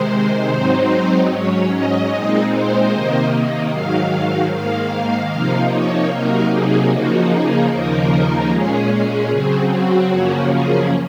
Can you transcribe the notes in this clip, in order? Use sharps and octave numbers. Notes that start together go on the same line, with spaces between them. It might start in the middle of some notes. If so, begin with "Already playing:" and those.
Already playing: C3 D#3 G#3 C5
G#2 F#3 C4 D#4
G#2 F#3 C#4 C#5
D#5
A#2 G#3 C4 D#4
C5
C3 D#3 A#3 D#4
G#2 D#3 F#3 F5
G#2 D#3 A#3 F5
C3 F3 A#3 D#4
C#5
C3 F#3 A#3 D#4 A#4
G#4
C#3 F3 A#3 D#4 F#4
G#4
D#2 C#3 F3 A#3 D#4 A#4
A#2 G#3 C#4 G#4
G#4
C#3 F#3 C4
F#4
F#2 C#3 F3 A#3 C#4
G#4